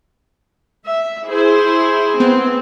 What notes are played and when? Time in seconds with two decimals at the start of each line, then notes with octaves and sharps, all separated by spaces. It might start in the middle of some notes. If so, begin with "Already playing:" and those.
0.87 E5
1.27 E4 G#4 C5
2.20 B3 C4